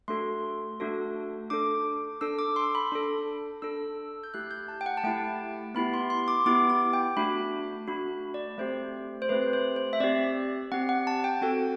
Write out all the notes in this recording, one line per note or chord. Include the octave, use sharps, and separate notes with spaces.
A3 D4 F#4 A4 C6
A3 D4 F#4 A4
D4 A4 D6
D4 A4 E6
D6
C6
B5
D4 A4
D4 A4 E6
G6
A3 E4 G4 F#6
G6
A5
G5
F#5
A5
A3 E4 G4 G5
B3 E4 G4 B5
C6
C6
D6
B3 E4 G4 D6
D6
G5
A3 D4 F#4 B5
A3 D4 F#4 B5
D5
A3 C4 G4 C5
C5
A3 C4 G4 B4
C5
C5
E5
C4 G4 D5
C4 G4 F#5
F#5
A5
G5
C4 F#4 A4 G5